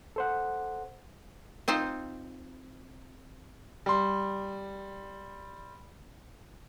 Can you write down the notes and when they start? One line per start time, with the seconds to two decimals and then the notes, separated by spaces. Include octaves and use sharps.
0.16 A4 C5 F#5
1.68 C4 D#4 F4 C5
3.86 G3 C6